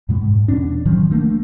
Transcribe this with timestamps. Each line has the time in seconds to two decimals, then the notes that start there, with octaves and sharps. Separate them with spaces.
0.09 F#2 B2 G#3
0.21 G#2
0.48 E2 B2 C#4 D4
0.85 A2 D#3 F3 F#3
1.11 A3 A#3 D4